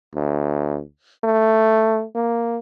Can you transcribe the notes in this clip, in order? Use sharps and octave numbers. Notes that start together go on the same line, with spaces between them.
D2
A3
A#3